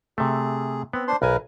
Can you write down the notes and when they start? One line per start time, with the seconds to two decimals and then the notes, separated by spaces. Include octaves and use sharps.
0.18 C3 A3 G#4
0.93 B3 C4
1.08 D4 C5 C6
1.22 B1 A#4 B4 G#5